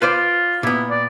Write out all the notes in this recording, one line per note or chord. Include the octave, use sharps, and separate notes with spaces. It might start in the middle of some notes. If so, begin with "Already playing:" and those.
F4 B4 C5 D5
A#2 B3 E4
D5